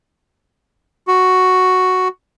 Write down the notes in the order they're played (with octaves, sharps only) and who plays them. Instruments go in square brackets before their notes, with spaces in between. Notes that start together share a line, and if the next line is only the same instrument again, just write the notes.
[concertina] F#4